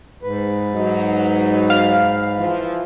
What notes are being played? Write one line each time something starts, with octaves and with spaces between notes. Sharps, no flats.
G#2 B4
F#3 D#4
F5
E3 F3